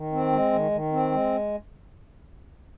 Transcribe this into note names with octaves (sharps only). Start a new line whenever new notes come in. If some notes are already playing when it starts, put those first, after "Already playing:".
Already playing: D#3
C4
G#3
D#3
D#3
C4
G#3